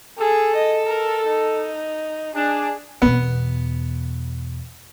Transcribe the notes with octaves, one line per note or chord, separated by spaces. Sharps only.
G#4 A4
D#5
A#4
D#4
D4 G#4
E2 B2 B3